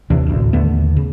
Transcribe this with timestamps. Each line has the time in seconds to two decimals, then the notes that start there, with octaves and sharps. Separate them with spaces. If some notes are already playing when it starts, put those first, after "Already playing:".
0.10 D#2 C3 E3 D4
0.27 A1 D2
0.53 D#2 D3 A3 B3
0.97 C#3